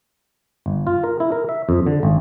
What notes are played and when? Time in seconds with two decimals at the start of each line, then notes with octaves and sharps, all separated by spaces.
0.66 G1
0.87 F4
1.04 A#4
1.20 E4
1.32 A#4
1.49 E5
1.69 F2
1.87 D3
2.03 G#1